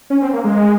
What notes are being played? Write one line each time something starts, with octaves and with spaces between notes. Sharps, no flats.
C#4
C4
A#3
G#3